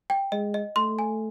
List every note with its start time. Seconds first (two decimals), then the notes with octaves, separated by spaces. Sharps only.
0.10 G5
0.32 G#3 D#5
0.54 D#5
0.76 A3 C6
0.99 G#5